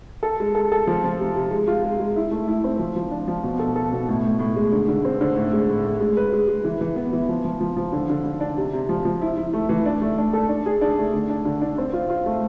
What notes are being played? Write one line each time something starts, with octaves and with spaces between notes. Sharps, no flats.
A4
G#3
A4
A4
F3
F3
C3
C3
G#3
F4
G#3
G#3
E4
A3
E4
C4
F3
F3
D4
F3
B2
A4
A4
B2
A2
A2
A2
G#3
D3
D3
C4
D3
A2
G#3
A2
A2
G#3
B4
G#3
G#3
E3
E3
B3
E3
F3
F3
F3
F3
D3
D3
D3
D4
C3
C3
F3
F3
E4
E4
A3
E3
D4
A3
D4
A4
D4
G#4
D4
A3
D3
D4
D3
D4
C4
F4
F4
A3